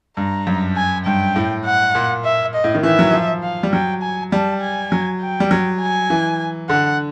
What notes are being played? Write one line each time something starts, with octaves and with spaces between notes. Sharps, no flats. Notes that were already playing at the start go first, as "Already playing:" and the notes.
G2 A#5
F#2
G#5
G2 G5
A2
F#5
A#2
E5
D#5
A2
D#3
E3 E5
F#3
F3
F5
G3
F#3 G5
G#5
G3 A5
G#5
F#3
G5
G3
F#3
G#5
E3
D3 F#5